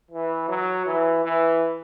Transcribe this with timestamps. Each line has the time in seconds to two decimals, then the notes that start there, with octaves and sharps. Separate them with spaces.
0.11 E3
0.49 F#3
0.86 E3
1.25 E3